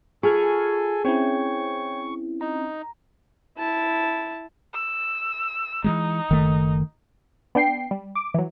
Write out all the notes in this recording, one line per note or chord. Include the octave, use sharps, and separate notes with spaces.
F4 G#4 A4 G#5 C#6 F6 G#6
C4 C#4 E4 C#5 G5 C#6 G#6
D#4 A#5
E4 A5
E6
E3 F#3 G#3 D#4
F#1 D#3 A3
B3 D4 G5 C7
G3
D6
E3 F#3